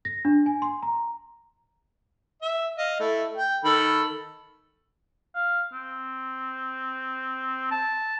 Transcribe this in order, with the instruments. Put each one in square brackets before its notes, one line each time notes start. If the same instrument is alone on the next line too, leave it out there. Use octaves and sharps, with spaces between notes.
[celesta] A#6
D4
G#5
C6
A#5
[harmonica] E5
D#5 F5
A3 E4
G5
D#3 A4 B5
[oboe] F5
C4
A5